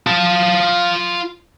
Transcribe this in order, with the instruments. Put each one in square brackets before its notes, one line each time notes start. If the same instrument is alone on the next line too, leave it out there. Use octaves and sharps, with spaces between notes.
[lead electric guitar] F4 A5